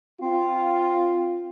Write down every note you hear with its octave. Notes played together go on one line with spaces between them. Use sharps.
C4 F4